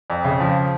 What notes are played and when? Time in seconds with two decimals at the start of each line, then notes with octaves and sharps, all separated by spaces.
0.10 F2
0.25 C#3
0.40 F3